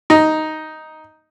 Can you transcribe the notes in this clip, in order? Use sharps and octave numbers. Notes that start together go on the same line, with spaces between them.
D#4